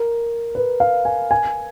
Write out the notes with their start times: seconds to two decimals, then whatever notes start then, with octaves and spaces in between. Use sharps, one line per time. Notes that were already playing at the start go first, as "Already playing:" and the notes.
Already playing: A#4
0.55 B4
0.80 F5
1.05 G#5
1.31 G#5